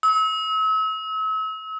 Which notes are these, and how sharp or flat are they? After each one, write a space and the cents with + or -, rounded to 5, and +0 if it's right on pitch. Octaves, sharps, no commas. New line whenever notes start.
E6 -40